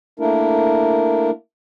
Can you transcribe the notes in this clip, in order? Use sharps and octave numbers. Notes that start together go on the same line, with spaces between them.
A3 A#3 D4 E4 A#4